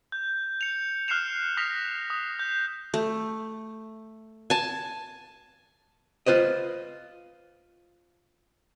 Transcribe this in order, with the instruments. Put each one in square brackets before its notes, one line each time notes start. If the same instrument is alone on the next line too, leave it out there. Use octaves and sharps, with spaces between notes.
[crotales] G6
C#7 F7
F6 F#6 C7 C#7 E7 F7
D#6 F6 A#6 B6 F7
D#6
G6
[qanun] A3
G#5 A5
[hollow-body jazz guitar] F4 B4 C5 D#5